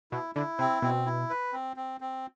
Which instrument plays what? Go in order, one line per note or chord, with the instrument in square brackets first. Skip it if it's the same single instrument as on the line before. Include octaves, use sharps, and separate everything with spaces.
[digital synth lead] B2 [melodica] E4
[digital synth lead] D3 [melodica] E4
[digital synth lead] C3 [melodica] C4
[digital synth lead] B2 [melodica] C4
[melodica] E4
B4
C4
C4
C4